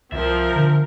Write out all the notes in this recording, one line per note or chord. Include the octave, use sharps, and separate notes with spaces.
C2 F3 C4 A#4 E5
D3